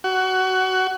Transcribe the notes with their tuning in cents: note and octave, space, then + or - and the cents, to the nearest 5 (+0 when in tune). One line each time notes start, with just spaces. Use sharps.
F#4 +20